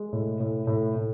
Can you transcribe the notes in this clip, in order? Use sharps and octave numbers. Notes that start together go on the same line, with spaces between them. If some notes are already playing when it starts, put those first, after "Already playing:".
Already playing: G#3
A2
A2
A2
A2